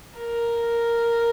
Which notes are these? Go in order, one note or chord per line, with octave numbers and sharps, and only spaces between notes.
A#4